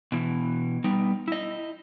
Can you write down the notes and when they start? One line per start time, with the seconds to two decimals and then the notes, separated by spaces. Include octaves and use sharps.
0.12 B2 E3
0.84 G3 B3 D#4
1.28 E4 D#5